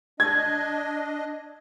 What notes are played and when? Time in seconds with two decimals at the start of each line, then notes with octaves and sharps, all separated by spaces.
0.20 D4 D#5 G#6